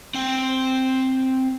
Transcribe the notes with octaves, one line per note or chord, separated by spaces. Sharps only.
C4 G5